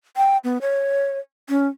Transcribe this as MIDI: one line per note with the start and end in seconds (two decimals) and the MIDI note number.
0.17 0.37 79
0.44 0.58 59
0.61 1.19 73
1.49 1.67 61